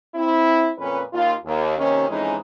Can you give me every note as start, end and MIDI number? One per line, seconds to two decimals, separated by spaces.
0.15 0.70 60
0.15 0.70 64
0.78 1.01 41
0.78 1.01 46
0.78 1.01 61
0.78 1.01 71
1.13 1.34 39
1.13 1.34 65
1.45 1.77 39
1.77 2.08 39
1.77 2.08 48
1.77 2.08 51
1.77 2.08 61
2.08 2.35 41
2.08 2.35 44
2.08 2.35 52
2.08 2.35 56
2.08 2.35 61
2.08 2.35 63